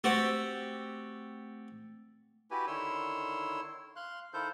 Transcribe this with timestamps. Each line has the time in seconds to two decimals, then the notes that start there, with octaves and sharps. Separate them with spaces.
0.04 A3 C4 F#4 G4
2.51 E4 F#4 G4 B4 G#5
2.67 D3 D#3 E4 C#5 C6 E6
3.96 F5 C6 F#6
4.34 D#3 E4 A4 C5 F5 G6